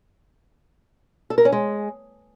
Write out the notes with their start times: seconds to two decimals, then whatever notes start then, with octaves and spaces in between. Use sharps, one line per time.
1.30 A4
1.38 A#4
1.45 C#4
1.52 G#3